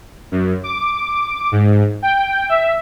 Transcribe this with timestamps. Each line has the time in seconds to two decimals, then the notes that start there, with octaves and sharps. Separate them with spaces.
0.31 F#2
0.63 D6
1.52 G#2
2.02 G5
2.49 E5